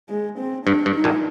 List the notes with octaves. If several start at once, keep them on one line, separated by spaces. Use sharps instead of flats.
G#3
C4
G2 D4
G2
D#4
A#1 A#2